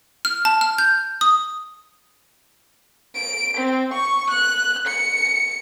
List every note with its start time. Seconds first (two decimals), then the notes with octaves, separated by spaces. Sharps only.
0.25 F6
0.45 A5
0.61 F6
0.78 G6
1.21 D#6
3.15 D7
3.57 C4
3.93 C#6
4.30 F#6
4.87 C#7